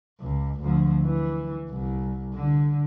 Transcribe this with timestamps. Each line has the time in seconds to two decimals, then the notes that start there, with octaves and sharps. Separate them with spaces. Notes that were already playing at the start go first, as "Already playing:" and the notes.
0.21 C#2
0.61 D2 F3
1.03 E3
1.70 C2
2.33 D3